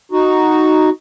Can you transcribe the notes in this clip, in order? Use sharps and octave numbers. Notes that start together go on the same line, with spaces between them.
D#4 F#4